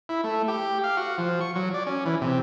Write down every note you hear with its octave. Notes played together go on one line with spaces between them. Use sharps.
E4
A3
G4
F5
F#4
F3
C#6
F#3
D5
C#4
E3
C3